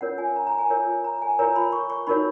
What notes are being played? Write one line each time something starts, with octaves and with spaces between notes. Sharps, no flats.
C#4 F4 A#4 C#5 F#5
G#5
A#5
A#5
G#5
F4 A#4 C#5
A#5
G#5
F4 A#4 C#5 A#5
B5
C#6
C#6
D#4 F#4 A#4 C#5 B5